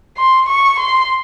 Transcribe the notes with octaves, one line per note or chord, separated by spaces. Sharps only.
C6
C#6
C6